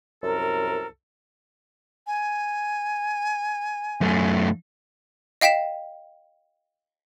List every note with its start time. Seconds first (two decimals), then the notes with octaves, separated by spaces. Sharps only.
0.23 C2 F#2 A4 A#4
2.07 G#5
4.01 F#2 A3
5.41 D#5 F5 G5 B6 E7